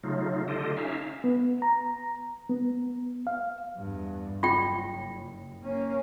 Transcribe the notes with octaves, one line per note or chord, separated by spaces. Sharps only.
C#3 F#3 A3 D#4 F4
D3 F4 G4 A4 D#5
C#4 D#4 E5 F5
B3
A#5
B3
F5
E2 G2
F#1 F4 G5
A#3 C#4